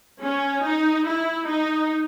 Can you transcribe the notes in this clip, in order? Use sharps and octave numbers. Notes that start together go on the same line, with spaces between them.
C#4
D#4
E4
D#4